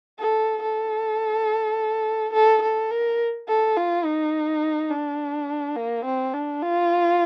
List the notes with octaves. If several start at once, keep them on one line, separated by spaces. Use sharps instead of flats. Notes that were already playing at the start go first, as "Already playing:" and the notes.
A4
A4
A4
A4
A#4
A4
F4
D#4
D4
A#3
C4
D4
F4